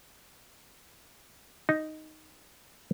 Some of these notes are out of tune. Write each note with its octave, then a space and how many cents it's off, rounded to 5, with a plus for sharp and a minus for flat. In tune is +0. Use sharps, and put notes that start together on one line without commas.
D#4 +0